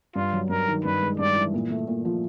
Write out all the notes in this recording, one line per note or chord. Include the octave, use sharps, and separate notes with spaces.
G2 F4
F#3
G2 A#4
D#3
G2 B4
G#3
G2 D5
E3
A#2
A3
A#2
F3